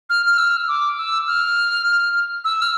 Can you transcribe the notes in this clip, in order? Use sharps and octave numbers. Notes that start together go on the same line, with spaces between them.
F6
F6
E6
D6
E6
F6
E6
F6